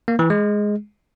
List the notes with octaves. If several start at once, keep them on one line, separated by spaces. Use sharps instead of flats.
A#3
E3
G#3